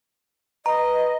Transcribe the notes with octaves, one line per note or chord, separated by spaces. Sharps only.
B4 D#5 A#5